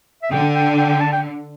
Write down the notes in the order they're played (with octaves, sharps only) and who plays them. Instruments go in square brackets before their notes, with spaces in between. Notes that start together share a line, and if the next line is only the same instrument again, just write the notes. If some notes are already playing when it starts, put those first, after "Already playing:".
[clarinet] E5
[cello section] D3 [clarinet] G5
[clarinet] G5
G5
G5
A5
G5